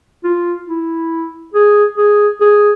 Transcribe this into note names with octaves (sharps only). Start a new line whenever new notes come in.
F4
E4
G#4
G#4
G#4